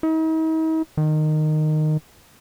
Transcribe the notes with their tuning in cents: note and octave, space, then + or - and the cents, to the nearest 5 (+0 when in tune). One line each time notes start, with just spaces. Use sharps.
D#4 +45
D#3 -15